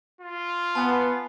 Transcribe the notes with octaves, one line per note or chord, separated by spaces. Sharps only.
F4
B3 G#5 A5